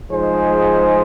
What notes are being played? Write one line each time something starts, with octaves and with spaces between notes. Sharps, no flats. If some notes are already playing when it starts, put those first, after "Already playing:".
F3 G#3 D#4 G#4 C5